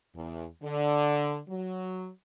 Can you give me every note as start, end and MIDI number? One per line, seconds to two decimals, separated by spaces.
0.15 0.45 40
0.64 1.38 50
1.48 2.08 54